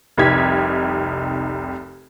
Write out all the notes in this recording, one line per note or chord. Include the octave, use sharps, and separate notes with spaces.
F1 C2 D#4 G4 G#6 B6